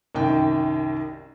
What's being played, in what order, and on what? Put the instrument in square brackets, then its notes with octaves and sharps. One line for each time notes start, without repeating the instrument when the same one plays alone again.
[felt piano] C2 F#2 D#3 G5